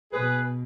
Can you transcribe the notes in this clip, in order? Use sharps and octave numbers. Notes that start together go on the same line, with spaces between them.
B2 G#4 B4